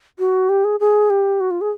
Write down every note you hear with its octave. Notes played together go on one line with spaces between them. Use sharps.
F#4
G4
G#4
G#4
G4
F#4
F4
G#4